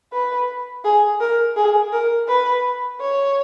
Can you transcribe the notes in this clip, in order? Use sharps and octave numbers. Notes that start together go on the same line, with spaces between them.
B4
G#4
A#4
G#4
A#4
B4
C#5